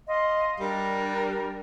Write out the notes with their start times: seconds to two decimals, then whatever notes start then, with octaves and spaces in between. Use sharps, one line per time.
0.07 D#5 F5 C6
0.60 G3 D4 A#4